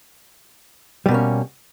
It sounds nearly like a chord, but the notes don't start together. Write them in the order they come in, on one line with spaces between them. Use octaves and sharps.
G3 B2 A#3 C#4